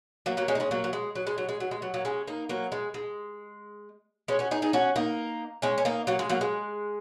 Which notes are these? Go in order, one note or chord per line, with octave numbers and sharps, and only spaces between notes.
F#3 A#3
F#3 A#3
G#3 C#4
D#4
G#3 C#4
F#3 A#3
F#3
G#3
F#3
G#3
F#3
G#3
F#3
G#3
F#3
F#3 A#3
G#3 C#4
A#3 D#4
F#3 A#3
G#3
G#3
G#3 C#4
C#4 F#4
D#4 G#4
D#4 G#4
C#4 F#4
A#3 D#4
G#3 C#4
C#4
A#3 D#4
F#3 A#3
G#3
F#3 A#3
G#3